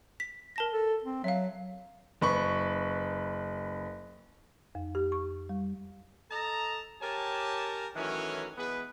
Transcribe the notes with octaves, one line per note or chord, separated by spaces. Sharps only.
B6
A#4 A5 A#6
A4
C4
F#3 E5 F5
F#1 B4 C#6
F2
G4
C#6
G3
A4 D#5 A5 A#5
G4 A#4 C#5 G#5 A5
A2 D#3 E3 F#3 C#4
E3 G#3 B3 G#4 B4